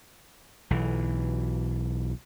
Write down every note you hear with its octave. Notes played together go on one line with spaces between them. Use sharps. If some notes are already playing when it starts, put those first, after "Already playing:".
B1 E3